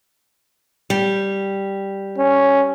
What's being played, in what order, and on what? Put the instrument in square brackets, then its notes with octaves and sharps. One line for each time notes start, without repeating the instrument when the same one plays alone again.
[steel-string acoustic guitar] G3
[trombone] C#4